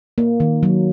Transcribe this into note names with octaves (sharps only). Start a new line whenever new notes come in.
A#3
D#3
F#3